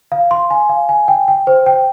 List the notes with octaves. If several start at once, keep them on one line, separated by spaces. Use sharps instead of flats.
F5
C6
G#5
F5
G#5
G5
G5
C5
G5